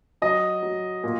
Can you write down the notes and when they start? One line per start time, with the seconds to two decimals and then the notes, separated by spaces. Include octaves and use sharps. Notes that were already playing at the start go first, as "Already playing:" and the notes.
0.22 F#3 D#5
0.63 F#3
1.04 A#2